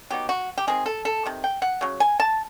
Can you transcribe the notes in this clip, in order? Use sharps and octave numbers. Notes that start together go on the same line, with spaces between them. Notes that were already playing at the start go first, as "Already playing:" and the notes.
F#3 B3 D#4 G4
F#4
G4
D#3 G#3 C4 G#4
A4
A4
C3 D#3
G5
F#5
C#3 F#3
G#5
A5